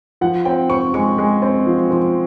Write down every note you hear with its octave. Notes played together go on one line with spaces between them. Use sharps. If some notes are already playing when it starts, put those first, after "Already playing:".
F3 F#5
C4 G5
C4 C#6
G#3 C#6
G#3
C4
F3
F3